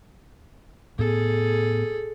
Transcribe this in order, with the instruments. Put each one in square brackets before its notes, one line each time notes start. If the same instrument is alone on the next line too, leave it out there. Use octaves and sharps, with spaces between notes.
[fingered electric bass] A2 B3 [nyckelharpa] G#4 A4